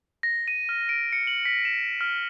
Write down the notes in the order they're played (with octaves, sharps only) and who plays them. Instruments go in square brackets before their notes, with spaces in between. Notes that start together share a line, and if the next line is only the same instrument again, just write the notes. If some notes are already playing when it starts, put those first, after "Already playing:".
[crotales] A#6
D#7
F6
D7
C#7
F#7
B6
E7
F6